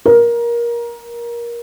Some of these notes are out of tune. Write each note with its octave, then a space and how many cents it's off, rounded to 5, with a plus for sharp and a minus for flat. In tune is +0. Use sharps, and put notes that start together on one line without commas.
A#4 +20